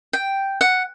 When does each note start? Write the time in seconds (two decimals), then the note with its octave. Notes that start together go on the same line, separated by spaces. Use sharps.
0.13 G5
0.61 F#5